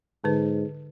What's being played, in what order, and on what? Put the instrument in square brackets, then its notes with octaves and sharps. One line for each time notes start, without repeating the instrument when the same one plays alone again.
[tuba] G#2 [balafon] D3 B4